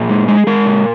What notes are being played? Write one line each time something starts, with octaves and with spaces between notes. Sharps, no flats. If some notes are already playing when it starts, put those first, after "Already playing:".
Already playing: A#2 G#4
G#3
G#3
G#3 A#4
A#2